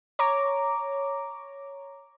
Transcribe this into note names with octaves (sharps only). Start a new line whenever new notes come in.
C#5 A#5 D6